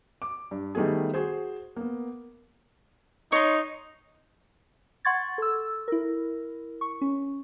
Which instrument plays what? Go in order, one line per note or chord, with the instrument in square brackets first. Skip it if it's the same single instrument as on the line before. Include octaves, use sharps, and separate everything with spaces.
[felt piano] D6
G2
D#3 G3 A3 B3 G#4
F#4 G#4 C5
A#3 B3
[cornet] D#4 [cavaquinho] C#5 C6
[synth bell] F#5 C6 C#6 G#6 A6
A4 E6
E4 A#4
C#6
C#4